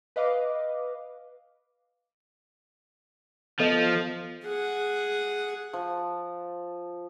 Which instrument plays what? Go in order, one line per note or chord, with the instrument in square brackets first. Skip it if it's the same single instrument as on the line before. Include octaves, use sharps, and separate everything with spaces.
[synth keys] B4 D#5 F5 D6
[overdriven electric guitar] F3 [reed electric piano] B3 A4 D#5
[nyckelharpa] G#4 F#5
[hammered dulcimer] F3